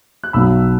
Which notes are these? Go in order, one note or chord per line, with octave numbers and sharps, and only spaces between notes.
F#6
B1 B2 F#3 B5 E6